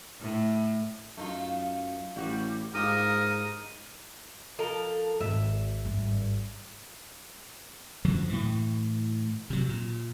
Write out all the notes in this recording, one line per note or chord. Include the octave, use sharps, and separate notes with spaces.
A2
F#2 A3 D#4 F4
A1 G3 F#4
G#2 D#4 F4 G4 A#4 D#6
F3 A4 A#4
G#1 E5
G#1 G2
F#2 D3 F3 F#3
A2 E3
C3 F#3
A#2